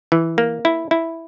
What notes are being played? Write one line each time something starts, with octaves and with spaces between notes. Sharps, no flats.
E3
A#3
E4
E4